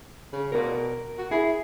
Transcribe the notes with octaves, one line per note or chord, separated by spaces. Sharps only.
C#3
B2 A#4 D5
A#4
F#4
E4 G#4